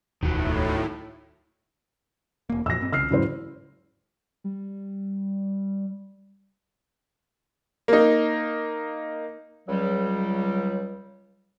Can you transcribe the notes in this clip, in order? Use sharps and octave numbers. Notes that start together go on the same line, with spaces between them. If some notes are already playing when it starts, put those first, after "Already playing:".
E1 D2 A2 D#3 F#3
E1 A#3
F2 A#2 F3 E6 A#6
G2 C4
C2 C#3 E6 F6 C7
E2 G#2 C#3 F#3 E4 C5
G3
A#3 D#4
C#2 F#3 G3